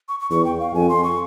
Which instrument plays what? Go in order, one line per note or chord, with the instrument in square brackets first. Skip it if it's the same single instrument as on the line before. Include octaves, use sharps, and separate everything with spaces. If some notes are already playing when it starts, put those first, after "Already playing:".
[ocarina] C#6
C#6
[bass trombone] E2 [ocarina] C#6
[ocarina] G5
F5
[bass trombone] F2 [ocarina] G#5
[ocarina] C6
C#6